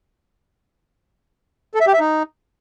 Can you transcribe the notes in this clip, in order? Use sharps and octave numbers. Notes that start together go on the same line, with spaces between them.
A4
E5
G4
E5
D#4